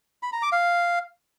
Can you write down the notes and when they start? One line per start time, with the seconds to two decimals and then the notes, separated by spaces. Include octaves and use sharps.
0.23 B5
0.33 A#5
0.42 D6
0.52 F5